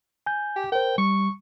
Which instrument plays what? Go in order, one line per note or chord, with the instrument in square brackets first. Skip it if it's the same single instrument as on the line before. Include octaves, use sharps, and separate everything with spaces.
[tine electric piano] G#5 G6
[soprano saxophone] G4
[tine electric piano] A#4 C5 [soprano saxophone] G5
[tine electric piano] G3 [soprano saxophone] C#6